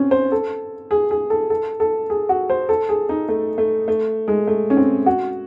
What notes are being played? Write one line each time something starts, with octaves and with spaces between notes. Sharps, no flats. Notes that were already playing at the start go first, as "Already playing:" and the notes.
Already playing: C4 C#4
C5
A4
G#4
G#4
A4
A4
A4
G#4
F#4
C5
A4
G#4
D#4
A3
A3
A3
G#3
A3
C#4
C4
F#4